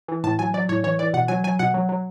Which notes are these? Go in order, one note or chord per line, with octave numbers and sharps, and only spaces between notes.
E3
A2 A5
F#3 G#5
F#3 D5
A2 C#5
E3 C#5
E3 D5
B2 F#5
F#3 G#5
F#3 G#5
B2 F#5
F#3
F#3